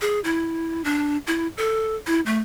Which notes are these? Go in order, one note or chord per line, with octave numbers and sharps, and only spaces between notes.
G#4
E4
D4
E4
A4
E4
A3